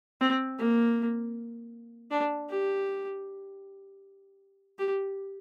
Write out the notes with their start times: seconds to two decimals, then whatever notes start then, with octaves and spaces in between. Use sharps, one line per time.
0.21 C4
0.59 A#3
2.11 D4
2.50 G4
4.79 G4